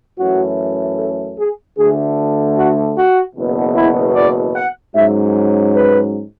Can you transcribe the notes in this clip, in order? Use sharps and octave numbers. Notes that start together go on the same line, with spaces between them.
F#2 E3 A3 C#4 F#4
A4
G#4
D2 D3 A3 G#4
F#4
F#4
F#1 E2 B2
E4
D5
F#5
G#2 F#3 C#4 E5
B4